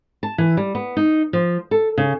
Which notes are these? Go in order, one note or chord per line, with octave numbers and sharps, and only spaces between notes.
A5
E3
G3
B3
D#4
F3
A4
C#3